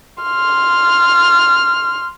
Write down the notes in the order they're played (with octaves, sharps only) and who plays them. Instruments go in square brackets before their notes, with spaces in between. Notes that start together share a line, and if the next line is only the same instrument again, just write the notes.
[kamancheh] C6 F6